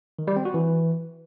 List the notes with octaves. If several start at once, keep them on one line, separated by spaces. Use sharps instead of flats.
D#3
G3
C4
F#4
E3